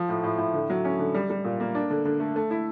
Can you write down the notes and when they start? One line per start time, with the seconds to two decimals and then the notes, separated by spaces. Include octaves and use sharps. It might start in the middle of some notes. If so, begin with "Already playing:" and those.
Already playing: F3
0.09 A2
0.23 A2
0.38 A2
0.54 D3
0.70 F#3
0.85 C#4
0.99 D3
1.14 G3
1.30 G3
1.44 A#2
1.60 A#3
1.75 D4
1.90 D3
2.05 D3
2.20 A3
2.36 A3
2.51 E4